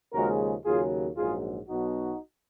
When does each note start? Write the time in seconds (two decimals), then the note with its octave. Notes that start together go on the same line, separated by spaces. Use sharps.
0.13 D#2 C#3 F3 G#3 F#4 A#4
0.65 D#2 C#3 F#3 F4 G#4
1.17 A#1 G#2 F#3 F4 G#4
1.69 B1 B2 F#3 D#4 F#4